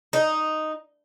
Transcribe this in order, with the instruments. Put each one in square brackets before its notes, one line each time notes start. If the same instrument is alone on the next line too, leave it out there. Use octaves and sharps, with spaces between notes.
[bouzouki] D#4